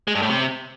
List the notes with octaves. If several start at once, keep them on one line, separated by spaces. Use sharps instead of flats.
G#3
G2
A2
C3